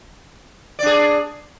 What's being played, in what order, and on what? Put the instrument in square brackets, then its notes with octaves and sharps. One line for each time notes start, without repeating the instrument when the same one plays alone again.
[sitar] D5
D4
G#4